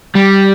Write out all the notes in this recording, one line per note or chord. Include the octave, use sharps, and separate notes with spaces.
G3